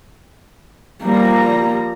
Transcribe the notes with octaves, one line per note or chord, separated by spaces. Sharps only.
F3 G3 A#3 A#5